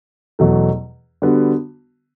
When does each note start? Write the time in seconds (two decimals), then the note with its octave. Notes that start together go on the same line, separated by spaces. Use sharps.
0.39 E2 B2 F#3 A3
1.22 D3 G3 B3 F#4